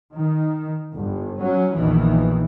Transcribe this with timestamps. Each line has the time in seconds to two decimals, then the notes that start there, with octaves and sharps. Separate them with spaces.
0.15 D#3
0.95 G1
1.41 F#3 C#4
1.73 A#1 E2 D#3 E3